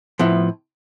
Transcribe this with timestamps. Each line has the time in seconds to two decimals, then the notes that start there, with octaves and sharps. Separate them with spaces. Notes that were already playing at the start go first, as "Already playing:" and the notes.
0.19 A2 F3 B3 E4